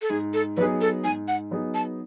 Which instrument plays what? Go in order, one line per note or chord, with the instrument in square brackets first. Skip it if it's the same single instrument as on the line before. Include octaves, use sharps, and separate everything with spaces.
[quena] A4
[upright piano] G#2 [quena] G#4
[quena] A4
[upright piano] F#3 B3 D#4 G#4 [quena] B4
[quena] A4
[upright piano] G#2 [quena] G#5
[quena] F#5
[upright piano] F#3 B3 D#4 G#4
[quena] A5